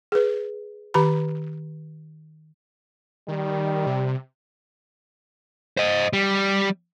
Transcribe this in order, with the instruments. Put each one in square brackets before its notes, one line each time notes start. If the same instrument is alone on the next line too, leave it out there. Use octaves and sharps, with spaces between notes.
[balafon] G#4 B4
D#3 G4 B4 A#5 B5
[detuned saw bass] D#3 [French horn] G3
[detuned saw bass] C3
[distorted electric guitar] C5 D#5
G3